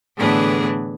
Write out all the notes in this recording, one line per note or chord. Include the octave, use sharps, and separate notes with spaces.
A2 D3 E3 B3 D4 G#4